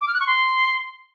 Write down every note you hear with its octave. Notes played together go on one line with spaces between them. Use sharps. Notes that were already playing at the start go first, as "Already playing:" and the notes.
D6
F6
F#6
C#6
C6